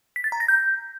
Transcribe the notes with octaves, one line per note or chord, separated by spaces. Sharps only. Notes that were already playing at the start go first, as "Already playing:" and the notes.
B6
A6
A#5
A#6
G6